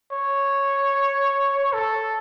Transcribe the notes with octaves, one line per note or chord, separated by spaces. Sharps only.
C#5
A4